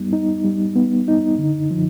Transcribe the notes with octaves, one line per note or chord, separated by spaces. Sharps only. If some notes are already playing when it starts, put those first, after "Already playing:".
Already playing: G3 B3 D#4
D#4
G3
B3
D#4
D3
F3